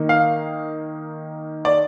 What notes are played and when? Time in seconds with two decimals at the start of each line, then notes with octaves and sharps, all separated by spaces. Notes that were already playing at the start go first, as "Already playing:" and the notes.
Already playing: D#3 A#3 D#4
0.09 F5
1.65 D5